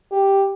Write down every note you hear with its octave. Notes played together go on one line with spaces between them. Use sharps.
G4